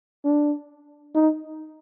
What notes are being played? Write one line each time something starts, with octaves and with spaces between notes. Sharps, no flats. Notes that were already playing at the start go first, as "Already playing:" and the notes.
D4
D#4